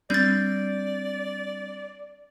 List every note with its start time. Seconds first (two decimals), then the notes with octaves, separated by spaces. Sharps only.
0.10 G3 C4 D4 D5 G6 A6